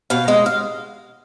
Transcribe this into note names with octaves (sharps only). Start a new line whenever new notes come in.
B2 F5
G#3 D#5
F5